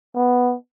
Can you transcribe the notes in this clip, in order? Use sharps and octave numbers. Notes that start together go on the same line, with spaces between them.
B3